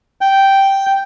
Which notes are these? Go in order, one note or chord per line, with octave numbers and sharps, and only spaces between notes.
G5